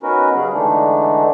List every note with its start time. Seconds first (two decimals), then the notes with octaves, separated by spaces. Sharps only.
0.03 B3 C#4 D#4 F#4 A#4 B4
0.35 C#3 F#3 G3 C#4 G#4
0.53 D3 E3 G#3 A3 D4 D#4